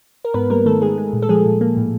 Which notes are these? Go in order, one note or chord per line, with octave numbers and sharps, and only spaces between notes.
A#4
G#2 B3 B4
G3 A#3 A#4
D#3 A3 A4
D#3 G#3 G#4
G#3
A#2
A4
F3 G#3 G#4
A#2
A#3
A2